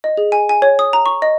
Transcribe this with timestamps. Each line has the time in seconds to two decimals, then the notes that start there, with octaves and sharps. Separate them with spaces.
0.04 D#5
0.17 G#4
0.32 G#5
0.49 G#5
0.62 C#5
0.79 D#6
0.93 A#5
1.06 C#6
1.22 D#5